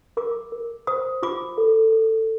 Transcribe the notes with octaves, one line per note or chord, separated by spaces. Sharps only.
A#4 D6
A#4
C5 D#6
F4 D6
A4
A4